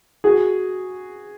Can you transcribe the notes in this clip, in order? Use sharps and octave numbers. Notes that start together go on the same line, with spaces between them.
F#4 G#4